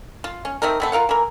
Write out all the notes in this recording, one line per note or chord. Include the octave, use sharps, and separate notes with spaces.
F4
C#4
A3 C4 D#4 A#4
A3 B3 C4
F4 A#4 F5 F#5
E3 A#4